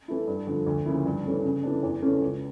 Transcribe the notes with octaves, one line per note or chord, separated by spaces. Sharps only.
E3 A3 E4
G2
D3 F3
D2
C#3 F3 A#3 E4
G2
E3 A3 C#4
C#3
E3 A3 D4
E2
C#3 E3 A3 C#4
C#2